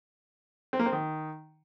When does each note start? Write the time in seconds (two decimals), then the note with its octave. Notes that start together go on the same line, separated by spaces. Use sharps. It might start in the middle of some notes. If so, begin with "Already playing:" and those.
0.73 C4
0.79 A#3
0.86 C4
0.92 D#3